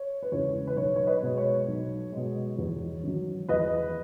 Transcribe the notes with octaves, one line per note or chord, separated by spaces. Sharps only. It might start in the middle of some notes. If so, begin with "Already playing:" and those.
Already playing: C#5
B4
E2 C#3 E3 G#3 C#5
B4
B1 C#5
C#5
B4 D#5
B2 G#3
C#5
B1
B2 G#3
E2
D#3 F#3
E2 B4 D#5